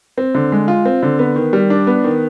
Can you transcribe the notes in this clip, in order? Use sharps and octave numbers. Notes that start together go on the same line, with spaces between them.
C4
D3
G#3
F4
C4
D3
B3
D#3
G3
D4
B3
D#3